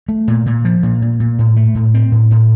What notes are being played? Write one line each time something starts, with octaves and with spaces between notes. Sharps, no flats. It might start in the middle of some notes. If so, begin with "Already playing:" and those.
A3
A#2
A#2
F3
A#2
A#2
A#2
A2
A3
A2
C4
A2
A2